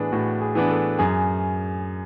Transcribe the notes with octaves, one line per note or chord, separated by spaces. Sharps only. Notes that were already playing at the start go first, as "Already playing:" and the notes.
Already playing: A2 E3 B3 D4 G#4 B4
A2 F#4
G#4
E3 B3 D4
A4
F#2 G#4